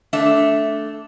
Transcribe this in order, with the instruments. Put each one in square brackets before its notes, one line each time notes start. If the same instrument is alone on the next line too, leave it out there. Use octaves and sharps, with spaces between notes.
[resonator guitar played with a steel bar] A3 D4 E5